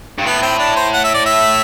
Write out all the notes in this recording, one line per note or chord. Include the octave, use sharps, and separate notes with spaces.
G2
A2 B3
C4
D4
C5
F#5
E5
D5
E5